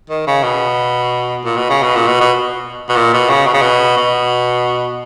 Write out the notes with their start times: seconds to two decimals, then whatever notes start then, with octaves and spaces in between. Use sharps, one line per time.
0.10 D#3
0.27 C#3
0.44 B2
1.45 A#2
1.57 B2
1.70 C#3
1.82 B2
1.95 A#2
2.08 B2
2.21 B2
2.89 B2
2.96 A#2
3.13 B2
3.29 C#3
3.47 B2
3.54 C#3
3.62 B2
3.97 B2